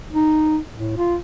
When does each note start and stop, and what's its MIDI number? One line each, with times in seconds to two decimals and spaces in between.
0.13 0.59 63
0.76 0.96 45
0.97 1.17 65